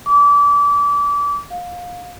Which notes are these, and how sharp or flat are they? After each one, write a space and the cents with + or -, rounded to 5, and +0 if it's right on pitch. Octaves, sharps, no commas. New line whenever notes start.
D6 -30
F5 +25